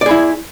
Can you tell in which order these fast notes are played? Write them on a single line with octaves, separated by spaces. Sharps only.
D5 G#4 E4